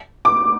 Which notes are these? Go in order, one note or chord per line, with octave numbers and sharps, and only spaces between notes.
D6